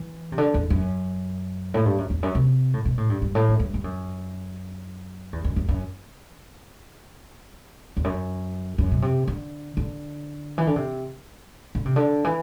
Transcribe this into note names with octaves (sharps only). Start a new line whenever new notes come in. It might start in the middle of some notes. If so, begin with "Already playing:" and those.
Already playing: E3
C3
D3
E2
F#2
A2
G2
F#2
E2
F#2
C3
A2
B2
A2
G2
G2
A2
F#2
G2
G2
F#2
E2
F#2
F#2
F#2
E2
F#2
F#2
B2
C3
D3
D3
E3
D3
C3
D3
C3
D3
E3